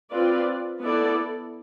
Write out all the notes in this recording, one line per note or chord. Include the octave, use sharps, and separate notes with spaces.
C4 F4 B4 D5
B3 E4 A4 D5